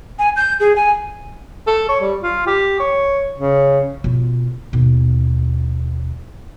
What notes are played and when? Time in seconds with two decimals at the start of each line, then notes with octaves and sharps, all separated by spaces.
0.19 G#5
0.36 G6
0.60 G#4
0.76 G#5
1.67 A4
1.89 C#5
2.01 G3
2.23 F4
2.47 G4
2.80 C#5
3.39 C#3
4.04 B2 F4
4.73 D#2 B2